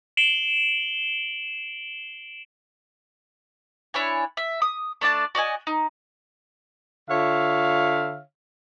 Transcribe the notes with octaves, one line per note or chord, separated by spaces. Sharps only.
C7 D7 E7 F#7 G7
D4 E4 C#5 G#5
E5
D#6
A3 D4 D5 A5
F#4 D5 D#5 G#5
D#4
D3 F4 C#5 E5 F5